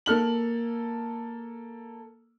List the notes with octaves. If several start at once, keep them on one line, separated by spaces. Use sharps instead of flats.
A#3 A4 F6 F#7